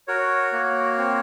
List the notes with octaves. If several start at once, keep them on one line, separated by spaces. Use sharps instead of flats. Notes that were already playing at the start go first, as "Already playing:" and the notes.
F#4 A#4 C#5
A#3
C4